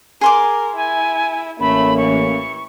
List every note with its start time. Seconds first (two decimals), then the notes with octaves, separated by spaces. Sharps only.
0.21 G#4 A#4 C6 D6
0.76 E4 G#5
1.60 A1 A3 A#3 C#4 B5
1.97 E3 C#6